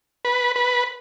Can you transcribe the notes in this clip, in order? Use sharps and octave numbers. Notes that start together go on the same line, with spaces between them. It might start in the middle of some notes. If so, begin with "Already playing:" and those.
B4
B4